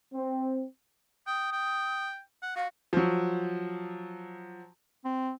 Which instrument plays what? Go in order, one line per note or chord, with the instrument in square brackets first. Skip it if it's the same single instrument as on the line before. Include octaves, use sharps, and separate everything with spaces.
[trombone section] C4
[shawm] G5 [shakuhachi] D#6
[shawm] G5
F#5
[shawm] F#4 [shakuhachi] F5
[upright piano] F3 F#3
[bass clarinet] C4